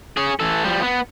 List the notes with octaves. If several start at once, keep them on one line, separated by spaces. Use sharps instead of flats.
C#4 G#4
E3 A4
F3 G3
B3